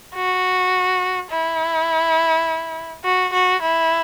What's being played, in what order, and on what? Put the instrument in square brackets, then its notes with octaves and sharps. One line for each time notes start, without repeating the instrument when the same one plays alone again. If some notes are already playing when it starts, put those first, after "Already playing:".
[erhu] F#4
E4
F#4
F#4
E4